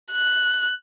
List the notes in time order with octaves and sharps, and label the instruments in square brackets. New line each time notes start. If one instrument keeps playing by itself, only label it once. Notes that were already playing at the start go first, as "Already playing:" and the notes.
[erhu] F#6